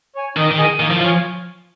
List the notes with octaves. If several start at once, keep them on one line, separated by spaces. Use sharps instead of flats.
C#5 G#5
D#3 D#4
D#3
G#4 D#5 G#5
D#3 A#3
F3
F3 F4 C#5 G#5